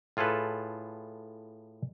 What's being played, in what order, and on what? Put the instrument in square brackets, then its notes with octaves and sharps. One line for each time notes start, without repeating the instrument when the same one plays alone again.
[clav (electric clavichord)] A2 F4 G#4 A4 B4